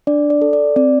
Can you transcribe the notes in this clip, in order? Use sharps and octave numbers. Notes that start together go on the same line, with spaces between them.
D4 D5
D5
A4
D5
C4 D5